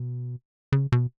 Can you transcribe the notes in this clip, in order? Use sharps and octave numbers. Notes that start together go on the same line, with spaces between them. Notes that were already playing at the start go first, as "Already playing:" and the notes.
Already playing: B2
C#3
B2